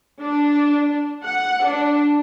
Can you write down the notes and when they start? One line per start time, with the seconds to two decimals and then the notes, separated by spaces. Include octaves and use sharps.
0.21 D4
1.24 F#5
1.65 D4